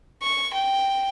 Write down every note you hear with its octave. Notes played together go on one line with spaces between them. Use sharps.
C#6
G5